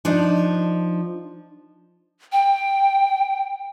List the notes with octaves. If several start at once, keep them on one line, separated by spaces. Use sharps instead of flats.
F3 D4 D#4
G5